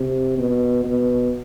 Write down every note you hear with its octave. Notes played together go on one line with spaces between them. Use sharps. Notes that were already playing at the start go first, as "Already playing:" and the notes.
Already playing: C3
B2
B2